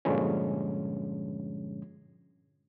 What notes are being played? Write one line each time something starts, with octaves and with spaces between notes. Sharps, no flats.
G2 A#2 D3 F3 G#3 C#4